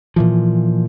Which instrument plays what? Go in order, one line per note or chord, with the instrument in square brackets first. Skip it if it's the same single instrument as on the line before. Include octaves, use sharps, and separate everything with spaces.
[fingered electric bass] A#2 E3 F3